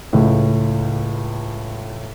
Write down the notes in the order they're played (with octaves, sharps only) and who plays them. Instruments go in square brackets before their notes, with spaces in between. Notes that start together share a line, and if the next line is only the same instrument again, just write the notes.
[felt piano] C#2 A2